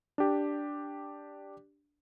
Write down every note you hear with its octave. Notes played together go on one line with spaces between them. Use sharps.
D4 G4